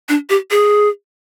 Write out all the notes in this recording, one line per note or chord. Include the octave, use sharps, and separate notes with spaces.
D4
G4
G#4